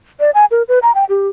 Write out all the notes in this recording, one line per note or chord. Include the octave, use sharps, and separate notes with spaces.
D5
G#5
A#4
B4
A#5
G5
G4